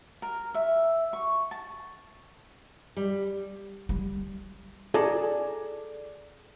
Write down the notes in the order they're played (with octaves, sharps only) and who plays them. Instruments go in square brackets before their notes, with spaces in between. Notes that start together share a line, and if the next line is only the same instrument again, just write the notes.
[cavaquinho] A#4
E5
C#6
A5
[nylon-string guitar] G3
[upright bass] G3
[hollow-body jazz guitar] G#4 A4 D5 A5 A#5